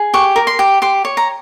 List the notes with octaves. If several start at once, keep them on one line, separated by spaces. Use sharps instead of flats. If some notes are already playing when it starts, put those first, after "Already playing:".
Already playing: G#4
G4 C#6
A#4
C6
G4
G4 C6
C#5
A#5